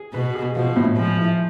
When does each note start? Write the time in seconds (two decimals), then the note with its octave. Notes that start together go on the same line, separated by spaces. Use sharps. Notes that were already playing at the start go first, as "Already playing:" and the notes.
Already playing: G#4
0.14 B2 B3
0.35 G#4
0.56 B2 F3
0.76 A2
0.97 F3 G#3
1.18 E4